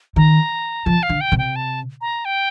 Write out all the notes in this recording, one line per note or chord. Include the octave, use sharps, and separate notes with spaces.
D#3 A#5
F3 A5
F5
D3
G5
C3
G5
A5
A#5
G5